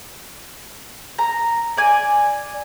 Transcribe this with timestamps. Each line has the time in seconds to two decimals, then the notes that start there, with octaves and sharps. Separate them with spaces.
1.19 A#5
1.77 D5 G#5